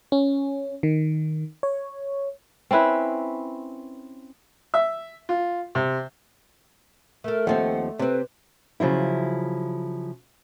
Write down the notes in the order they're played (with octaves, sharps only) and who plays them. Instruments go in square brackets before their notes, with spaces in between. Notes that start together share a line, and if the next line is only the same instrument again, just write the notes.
[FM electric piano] C#4
D#3
C#5
[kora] C4 C#4 E4 B4
[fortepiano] E5
F4
C3
[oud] A3 A4 [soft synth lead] A#4
[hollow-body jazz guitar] D#2 F3 C4 [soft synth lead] F#5
[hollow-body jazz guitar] C3 C4 [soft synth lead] B4
[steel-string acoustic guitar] C#3 F3 F#3 E4